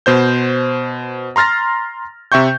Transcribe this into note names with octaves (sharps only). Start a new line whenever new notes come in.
B2 C5 G6
A#5 C6 F6 A6 A#6
C3 E5 G5 C#6 G6